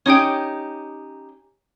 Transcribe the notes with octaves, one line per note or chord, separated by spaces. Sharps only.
C#4 D#4 G4 C#5 G5